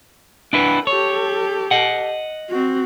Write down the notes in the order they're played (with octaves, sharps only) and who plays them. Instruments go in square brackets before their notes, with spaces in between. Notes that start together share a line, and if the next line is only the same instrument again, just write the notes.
[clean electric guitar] D4 E4 B4 [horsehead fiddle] F#5
[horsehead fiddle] G4 A4 [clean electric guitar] C#5
[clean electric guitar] D#5 F#5
[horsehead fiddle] C4 F#4